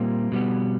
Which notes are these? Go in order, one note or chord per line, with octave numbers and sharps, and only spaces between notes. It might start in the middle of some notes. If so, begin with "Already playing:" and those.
Already playing: A#2 G3 A#3 C4
B2 G3 B3